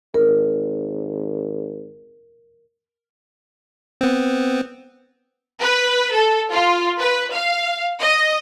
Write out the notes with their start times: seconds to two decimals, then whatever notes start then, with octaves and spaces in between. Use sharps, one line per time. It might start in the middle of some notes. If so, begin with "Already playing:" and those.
0.14 G#1 A#4
4.01 B3 C4
5.62 B4
6.14 A4
6.54 F4
7.00 B4
7.34 F5
8.02 D#5